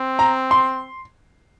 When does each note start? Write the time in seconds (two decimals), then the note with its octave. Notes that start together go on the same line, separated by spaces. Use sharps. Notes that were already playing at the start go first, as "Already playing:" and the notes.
Already playing: C4
0.19 A#5
0.51 C6